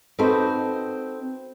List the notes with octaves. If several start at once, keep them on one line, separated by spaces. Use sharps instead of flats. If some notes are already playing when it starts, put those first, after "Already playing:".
C4 D#4 F#4 A4 B4 C5